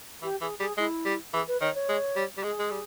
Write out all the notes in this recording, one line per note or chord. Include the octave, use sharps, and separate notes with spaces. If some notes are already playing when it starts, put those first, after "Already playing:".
E3 G4
E3 G#4
G3 G#4
G#3 E4
G3
E3 G#4
B4
D#3 C#5
C#5
G#3
G3
G3
G#3 G#4
G#3
G3